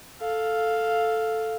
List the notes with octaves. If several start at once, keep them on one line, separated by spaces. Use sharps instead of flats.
A4 F5